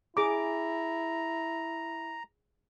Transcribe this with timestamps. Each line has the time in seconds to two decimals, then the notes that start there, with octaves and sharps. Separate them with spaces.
0.17 E4 G#4 A#5 D6